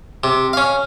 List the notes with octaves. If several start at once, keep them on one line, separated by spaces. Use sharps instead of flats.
C3
C#4 F5